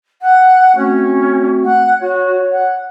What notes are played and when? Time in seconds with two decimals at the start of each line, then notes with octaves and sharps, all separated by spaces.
0.22 F#5
0.76 A3 C4 C#4 F#4
1.64 F#5
2.01 F#4 C#5
2.52 F#5